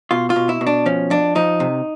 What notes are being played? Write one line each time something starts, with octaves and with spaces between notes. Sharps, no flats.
B2 F4
F4
B2
E4
B2
D4
F3 C#4
F2 D4
F3 D#4
C3